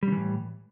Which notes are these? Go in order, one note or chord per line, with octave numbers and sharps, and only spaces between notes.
A2 C#3 E3 G3